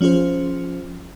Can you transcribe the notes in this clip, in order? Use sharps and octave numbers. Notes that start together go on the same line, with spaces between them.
F3 C#4 F4 G#4 C5